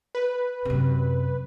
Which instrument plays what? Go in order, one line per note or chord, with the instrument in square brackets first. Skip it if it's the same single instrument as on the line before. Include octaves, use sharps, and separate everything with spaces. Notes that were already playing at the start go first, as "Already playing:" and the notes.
[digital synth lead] B4
[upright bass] F#2 C3